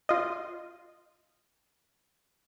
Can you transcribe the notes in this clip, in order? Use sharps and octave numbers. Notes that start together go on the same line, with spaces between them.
F4 D#5